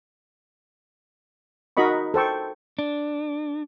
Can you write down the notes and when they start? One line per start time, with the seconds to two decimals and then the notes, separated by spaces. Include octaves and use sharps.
1.77 D#4 F#4 A#4 D#5 B5 C#6
2.14 A4 C5 G5 C#6
2.79 D4